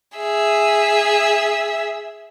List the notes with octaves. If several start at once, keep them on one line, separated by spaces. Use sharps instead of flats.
G#4 E5